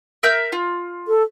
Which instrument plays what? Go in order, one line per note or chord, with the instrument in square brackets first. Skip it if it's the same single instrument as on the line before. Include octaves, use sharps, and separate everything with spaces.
[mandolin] A#4 E5 G6
F4
[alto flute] A4